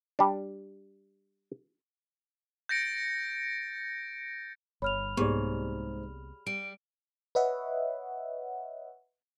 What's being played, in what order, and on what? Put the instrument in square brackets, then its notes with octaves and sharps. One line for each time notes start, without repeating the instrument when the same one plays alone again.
[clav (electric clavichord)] G3 D4
[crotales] G6 A6 A#6 C#7 D7
[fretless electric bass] G1 [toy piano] C#5 [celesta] B5 F6 F7
[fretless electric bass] C2 A#3 B3 [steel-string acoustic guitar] G#2 [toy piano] G4 G#4 D5
[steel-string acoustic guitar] G3 [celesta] D7
[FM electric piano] B4 C#5 D#5 E5 F#5